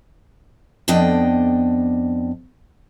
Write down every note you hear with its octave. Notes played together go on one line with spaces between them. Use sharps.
F2 B3 D4 D5 D#5 G5